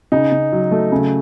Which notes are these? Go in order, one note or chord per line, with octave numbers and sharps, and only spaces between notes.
C#3 D#4
C#3
F#3
A3
C#3